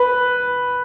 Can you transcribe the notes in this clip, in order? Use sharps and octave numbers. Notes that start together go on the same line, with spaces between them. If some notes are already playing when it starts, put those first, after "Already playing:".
Already playing: B4